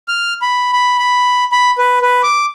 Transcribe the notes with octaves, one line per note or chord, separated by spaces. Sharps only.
F6
B5
B5
B5
B5
B4
B4
D6